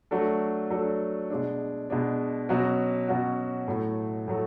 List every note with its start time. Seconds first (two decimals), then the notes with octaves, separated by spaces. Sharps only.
0.11 F#3 A3 D4 F#4 A4
0.70 F#3 A3 D4 F#4 A4
1.30 B2 G#3 D4
1.90 B2 G#3 D4
2.49 B2 F#3 C#4 F#4
3.08 B2 F#3 C#4 F#4
3.68 A2 F#3 A3
4.28 A2 F#3 A3